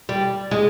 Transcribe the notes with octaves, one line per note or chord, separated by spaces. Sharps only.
G3
G#3